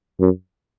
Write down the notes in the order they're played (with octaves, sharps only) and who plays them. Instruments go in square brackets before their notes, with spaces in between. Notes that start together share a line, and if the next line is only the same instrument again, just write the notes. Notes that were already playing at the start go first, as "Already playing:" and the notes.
[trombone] F#2